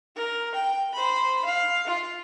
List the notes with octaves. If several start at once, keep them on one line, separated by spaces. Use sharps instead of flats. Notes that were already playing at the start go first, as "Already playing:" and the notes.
A#4
G5
C5 B5
F5
F4